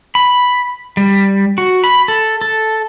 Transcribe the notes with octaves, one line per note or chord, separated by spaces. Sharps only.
B5
G3
F#4
B5
A4
A4